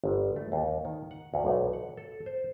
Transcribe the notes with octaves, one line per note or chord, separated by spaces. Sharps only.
G1
A3
D#2
D#3
F#5
D2
B1
F#5
A4
C5